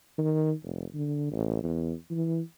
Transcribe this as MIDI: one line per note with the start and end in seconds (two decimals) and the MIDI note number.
0.18 0.53 51
0.63 0.85 29
0.94 1.30 50
1.32 1.63 33
1.63 1.93 40
2.11 2.40 52